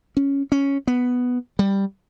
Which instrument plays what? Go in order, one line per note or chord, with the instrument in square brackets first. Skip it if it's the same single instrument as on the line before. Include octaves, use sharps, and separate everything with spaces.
[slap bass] C#4
C#4
B3
G3